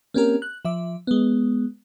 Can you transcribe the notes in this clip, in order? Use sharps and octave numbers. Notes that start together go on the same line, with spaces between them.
A#3 C4 C#4 G4 A#4
F#6
F3 E5 D6
G#3 B3